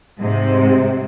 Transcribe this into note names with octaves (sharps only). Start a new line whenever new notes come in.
G#2 C3